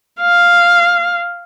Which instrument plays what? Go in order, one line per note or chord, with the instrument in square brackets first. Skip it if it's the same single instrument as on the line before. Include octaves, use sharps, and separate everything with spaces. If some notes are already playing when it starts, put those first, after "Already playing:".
[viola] F5